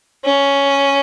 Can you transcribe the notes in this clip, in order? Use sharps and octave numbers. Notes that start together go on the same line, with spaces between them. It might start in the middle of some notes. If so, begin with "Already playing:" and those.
C#4